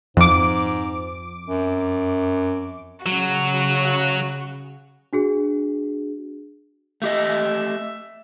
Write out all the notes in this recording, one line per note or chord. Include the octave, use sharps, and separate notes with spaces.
F2 G#2 D6
F#2
C#3 F#3 F#4
D4 F#4 G#4
A3 G4 D#5 E5